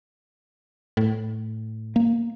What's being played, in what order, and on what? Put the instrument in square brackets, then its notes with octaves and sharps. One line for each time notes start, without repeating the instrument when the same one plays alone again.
[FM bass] A2
[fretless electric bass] A#3